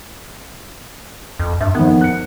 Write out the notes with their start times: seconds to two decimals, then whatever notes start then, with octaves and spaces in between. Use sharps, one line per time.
1.39 F2
1.61 G2 E5
1.75 F2 D#3 B3
2.01 F#6 C#7